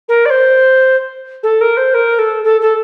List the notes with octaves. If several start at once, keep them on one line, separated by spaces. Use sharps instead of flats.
A#4
D5
C5
A4
A#4
C5
A#4
A4
A4
A4